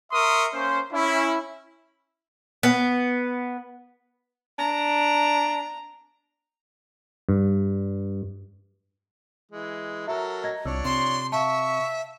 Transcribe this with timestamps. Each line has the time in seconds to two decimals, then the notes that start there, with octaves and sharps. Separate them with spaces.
0.12 A#4 E5 C6 C#6 D#6
0.54 A#3 C#4 C5
0.93 C#4 E4
2.63 B3
4.59 D4 A#5
7.29 G2
9.51 E3 G#3
10.07 F#3 A4 A#4 E5
10.44 D#5 G#6 A#6
10.66 C2 F3 D4 C#5 E6
10.85 C3 C6
11.32 E5 F5 A5 C#6